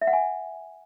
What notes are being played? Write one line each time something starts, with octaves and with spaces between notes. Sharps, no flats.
E5
F#5
G#5